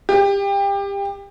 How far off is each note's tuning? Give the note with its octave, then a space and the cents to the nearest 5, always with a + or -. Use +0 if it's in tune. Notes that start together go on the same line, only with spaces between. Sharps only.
G4 +25